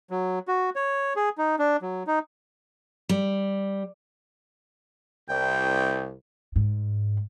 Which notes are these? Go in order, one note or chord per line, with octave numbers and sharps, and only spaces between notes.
F#3
F#4
C#5
G#4
D#4
D4
F#3
D#4
G3
C2 G5
G#2